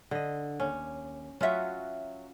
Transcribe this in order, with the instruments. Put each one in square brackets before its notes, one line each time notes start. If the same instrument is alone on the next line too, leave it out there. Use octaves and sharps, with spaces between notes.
[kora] D3 D#5
[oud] D#2 [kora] C#4
[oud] F#3 E5 [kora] C#4 F4 F#4